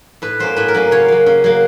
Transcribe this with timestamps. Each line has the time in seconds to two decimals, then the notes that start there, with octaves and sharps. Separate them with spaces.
0.22 A2 B4
0.39 F#3 A#3 C#4 C5
0.56 A2 B4
0.68 A#4
0.74 F#3 A#3 C#4
0.91 C#3 C#5
1.08 F#3 A#3
1.26 C#3
1.44 F#3 A#3